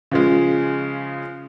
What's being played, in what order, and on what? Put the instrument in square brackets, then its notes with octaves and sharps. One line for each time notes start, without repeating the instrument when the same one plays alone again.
[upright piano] C#3 F3 G#3